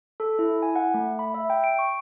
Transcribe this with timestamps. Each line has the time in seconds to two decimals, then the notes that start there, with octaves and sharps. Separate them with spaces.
0.20 A4
0.39 E4
0.62 G#5
0.76 F#5
0.94 A3
1.19 B5
1.34 E5
1.50 G5
1.64 D7
1.79 C#6